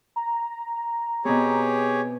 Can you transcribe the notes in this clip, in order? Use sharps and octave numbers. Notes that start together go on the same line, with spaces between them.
A#5
B2 C4 G4 G#4 C#5